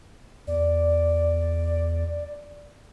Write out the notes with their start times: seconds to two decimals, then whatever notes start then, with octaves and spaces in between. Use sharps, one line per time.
0.47 E2 D5